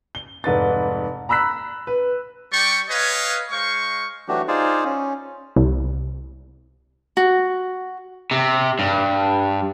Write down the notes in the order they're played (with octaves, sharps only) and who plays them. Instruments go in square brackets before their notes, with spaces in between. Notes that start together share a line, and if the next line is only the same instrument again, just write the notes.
[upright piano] G7
F1 G#2 B4 A6
A#5 B5 E6 F#6 B6
B4
[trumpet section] G3 D5 G5 C#6
B4 C#5 D#5 F5 G#5
G#3 C5 F5 C#6
[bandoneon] E3 F#3 A3 D4 F#4 G4
D#4 F4 G#4 C5 D5
C#4
[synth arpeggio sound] C2
[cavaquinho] F#4
[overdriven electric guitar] C3
G2